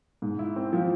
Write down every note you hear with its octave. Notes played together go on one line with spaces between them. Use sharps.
G#2
E4
C4
F3